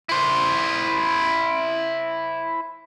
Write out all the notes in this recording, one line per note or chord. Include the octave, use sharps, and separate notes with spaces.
E4 C5